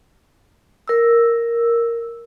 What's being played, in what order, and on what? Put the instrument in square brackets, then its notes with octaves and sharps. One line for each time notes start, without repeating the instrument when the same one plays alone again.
[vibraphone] A#4 E6